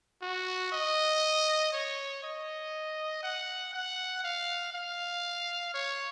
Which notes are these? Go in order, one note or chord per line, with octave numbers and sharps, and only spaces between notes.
F#4
D#5
C#5
D#5
F#5
F#5
F5
F5
C#5